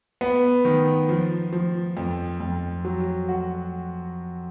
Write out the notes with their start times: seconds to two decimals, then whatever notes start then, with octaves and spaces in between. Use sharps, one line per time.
0.21 B3
0.65 D#3
1.09 F3
1.53 F3
1.97 F2
2.40 F2
2.85 F#3
3.29 F#4